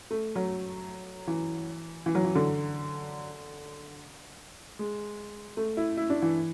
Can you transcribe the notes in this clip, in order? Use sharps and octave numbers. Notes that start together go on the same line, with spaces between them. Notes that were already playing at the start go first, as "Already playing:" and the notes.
A3
F#3
E3
E3
F#3
E3
D3
G#3
A3
E4
E4
D4
E3